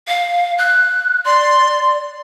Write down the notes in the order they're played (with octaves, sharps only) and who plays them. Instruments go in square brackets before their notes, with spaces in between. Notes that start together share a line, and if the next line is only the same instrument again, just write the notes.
[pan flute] F5
F#6
[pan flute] D5 [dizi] C6